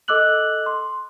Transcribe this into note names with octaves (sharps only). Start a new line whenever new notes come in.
A4 D#5 D6 E6 F#6 F#7
C6